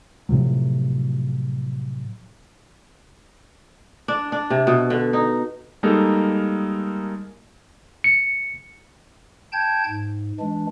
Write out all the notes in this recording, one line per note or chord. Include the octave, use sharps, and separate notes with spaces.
A2 C3 F3 F#3
D4
D4
C3
B2
D3
D#4
G3 G#3 A#3 D#4 A4 A#4
C#7
G5 A5 G6 G#6
G#2
E3 G#3 D4